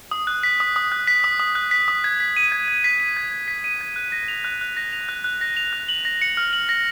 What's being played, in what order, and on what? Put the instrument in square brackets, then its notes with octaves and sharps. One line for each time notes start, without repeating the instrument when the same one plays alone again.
[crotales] D#6
F#6
B6
D#6
D#6
F#6
B6
D#6
D#6
F#6
B6
D#6
G#6
B6
D#7
G#6
G#6
B6
D#7
G#6
G#6
B6
D#7
G#6
F#6
A#6
F7
F#6
F#6
A#6
F7
F#6
F#6
A#6
F7
F#6
F#7
A#6
C#7
F6
F#7
A#6